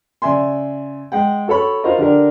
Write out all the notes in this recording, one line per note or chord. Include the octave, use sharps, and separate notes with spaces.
C#3 D5 E5 G#5 C6
G#3 F#5 G5
F#4 A4 C#5 B5 C#6
F4 F#4 A#4 C5 D#5
D3 D4 G4 A#4